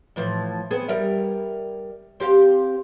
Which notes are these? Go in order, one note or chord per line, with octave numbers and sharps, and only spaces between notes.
A2 E3 F3
B3 C4 G#4
G3 A#4 E5
C4 G4 F5